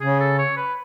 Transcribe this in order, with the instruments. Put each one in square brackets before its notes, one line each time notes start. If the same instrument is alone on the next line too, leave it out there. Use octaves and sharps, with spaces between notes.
[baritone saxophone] C#3 [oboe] G#4
[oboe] A4
C#5
B4